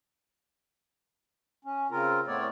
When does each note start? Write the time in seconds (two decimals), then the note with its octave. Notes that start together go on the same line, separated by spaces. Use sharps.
1.65 C#4
1.91 C#3 C4 F4 A#4
2.27 A2 A3 B3 C4 C#5 D5